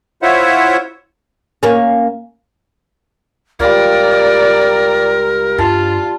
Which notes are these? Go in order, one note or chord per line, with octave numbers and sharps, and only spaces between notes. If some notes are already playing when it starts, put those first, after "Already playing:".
E4 F4 C5 C#5 E5 F#5
A#3 C#4
C#2 G3 F4 A#4 D5
G2 F4 A5